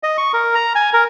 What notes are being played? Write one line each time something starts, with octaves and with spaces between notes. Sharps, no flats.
D#5
C#6
A#4
A#5
G#5
A#4